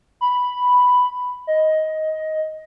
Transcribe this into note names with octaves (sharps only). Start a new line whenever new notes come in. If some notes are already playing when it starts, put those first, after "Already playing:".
B5
D#5